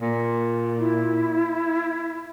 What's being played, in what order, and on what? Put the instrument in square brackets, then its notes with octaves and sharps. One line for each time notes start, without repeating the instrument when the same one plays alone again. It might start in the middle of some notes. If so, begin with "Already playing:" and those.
[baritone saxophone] A#2
[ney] E4